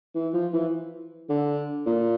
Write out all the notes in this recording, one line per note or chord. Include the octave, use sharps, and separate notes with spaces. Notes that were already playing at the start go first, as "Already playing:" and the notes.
E3
F3
E3
D3
A#2